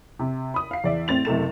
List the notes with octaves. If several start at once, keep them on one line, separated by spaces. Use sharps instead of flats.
C3
B5 D#6
F5 C7
E2 D5 E5
A2 C4 A6 F7
F#1 C3 A3 E7